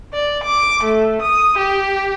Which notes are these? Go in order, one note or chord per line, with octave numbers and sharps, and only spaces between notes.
D5
D6
A3
D#6
G4